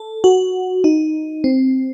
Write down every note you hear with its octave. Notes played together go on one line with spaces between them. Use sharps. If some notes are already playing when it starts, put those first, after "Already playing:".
Already playing: A4
F#4
D#4
C4